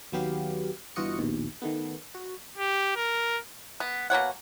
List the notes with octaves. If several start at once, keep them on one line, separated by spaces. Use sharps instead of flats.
D#2 F#3 B3 G4 F5
G1 E3 F4 F#4 D#5 C#7
A#1 D#2 B2
D#3 A3 B3
F#4
G4
A#4
B3
B2 A#3 C#5 F#5